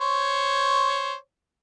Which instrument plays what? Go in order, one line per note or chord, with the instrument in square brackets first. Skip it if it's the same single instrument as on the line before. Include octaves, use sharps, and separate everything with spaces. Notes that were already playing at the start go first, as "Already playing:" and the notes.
[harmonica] C5 C#5